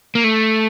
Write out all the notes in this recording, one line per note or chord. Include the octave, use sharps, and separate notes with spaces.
A#3
A3